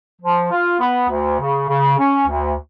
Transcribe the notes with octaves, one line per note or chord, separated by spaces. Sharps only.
F3
F4
B3
D2
C#3
C#3
C#4
D2